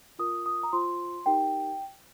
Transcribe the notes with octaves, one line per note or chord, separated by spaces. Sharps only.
F4 A#4 D#6
D#6
A#5
F4 C5 C6
D#4 G4 A#4 G5